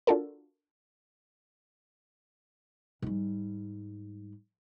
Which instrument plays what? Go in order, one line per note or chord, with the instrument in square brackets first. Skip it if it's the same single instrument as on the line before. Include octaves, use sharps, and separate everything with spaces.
[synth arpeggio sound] D4 F4 F#4 A4 A#4
[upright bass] G#2 G3